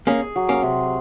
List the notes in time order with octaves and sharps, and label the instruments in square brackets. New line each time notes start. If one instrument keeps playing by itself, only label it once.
[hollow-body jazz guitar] A#3 C#4 [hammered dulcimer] G#4
[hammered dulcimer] F#3
[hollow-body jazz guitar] A#3 C#4
[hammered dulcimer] C3